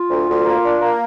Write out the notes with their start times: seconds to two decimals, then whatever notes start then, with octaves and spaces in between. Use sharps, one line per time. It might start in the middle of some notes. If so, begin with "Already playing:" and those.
Already playing: F4
0.10 D2
0.28 D2
0.45 A#3
0.63 D4
0.81 A#3